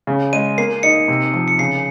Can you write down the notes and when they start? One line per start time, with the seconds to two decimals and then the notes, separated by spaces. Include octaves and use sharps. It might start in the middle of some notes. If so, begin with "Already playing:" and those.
0.07 C#3
0.33 G#3 D#7
0.58 A#3 C7
0.83 D#4 C#7
1.08 C3
1.34 F3
1.48 C#7
1.59 C#3 C7